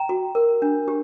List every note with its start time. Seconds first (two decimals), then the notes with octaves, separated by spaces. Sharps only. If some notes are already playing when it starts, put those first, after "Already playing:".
Already playing: G5 A#5
0.09 F#4
0.35 A#4
0.62 D4
0.88 G4